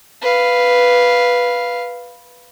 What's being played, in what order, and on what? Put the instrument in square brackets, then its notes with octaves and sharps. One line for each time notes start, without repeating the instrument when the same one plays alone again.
[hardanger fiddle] B4 F5